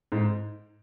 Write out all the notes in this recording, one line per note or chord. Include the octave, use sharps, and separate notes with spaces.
G#2